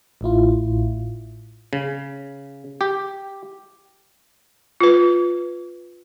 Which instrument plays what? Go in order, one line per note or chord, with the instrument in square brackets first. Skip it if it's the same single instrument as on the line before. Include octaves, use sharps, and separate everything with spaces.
[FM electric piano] A1 A2 E4 F4
[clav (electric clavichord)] C#3
G4
[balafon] F4 B4